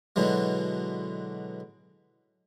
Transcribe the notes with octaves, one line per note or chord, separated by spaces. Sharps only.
B2 D3 E3 F#3 G#3